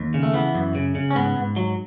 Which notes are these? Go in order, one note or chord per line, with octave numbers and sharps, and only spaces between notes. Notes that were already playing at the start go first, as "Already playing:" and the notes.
Already playing: D#2
C#3
A3
E3 B3
F#2
C#3
C#3
C#4
G#2 B3
G#2
F#3